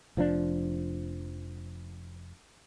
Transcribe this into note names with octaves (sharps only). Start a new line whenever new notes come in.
F1 F3 C4 D4